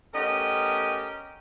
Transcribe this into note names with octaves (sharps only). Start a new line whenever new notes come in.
A3 B3 C#4 G4 A#4 D#5